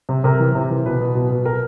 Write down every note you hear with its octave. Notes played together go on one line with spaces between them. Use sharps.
C3
C3 A#4
E3
C3
E3
B2 B4
B2
B2
B2
B2 A#4